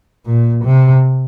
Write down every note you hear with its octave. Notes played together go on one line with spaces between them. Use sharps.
A#2
C3